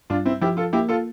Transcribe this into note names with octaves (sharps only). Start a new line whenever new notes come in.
G2 D4 F4
C4 E4
F3 E4 G4
F4 A4
A#3 E4 G4
F4 A4